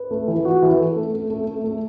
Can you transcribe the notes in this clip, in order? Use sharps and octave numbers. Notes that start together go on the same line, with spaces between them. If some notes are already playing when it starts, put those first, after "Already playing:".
Already playing: B4
A3
E3
F#4
E3
A4
A3
A3
A3
A3
A3